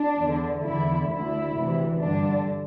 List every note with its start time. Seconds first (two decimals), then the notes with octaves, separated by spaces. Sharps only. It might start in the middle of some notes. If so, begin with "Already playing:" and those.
Already playing: D4
0.17 E2 D3
0.63 E2 D3 E4
1.09 D2 D3 E4
1.55 D2 C3 E3
2.01 G2 D3 D4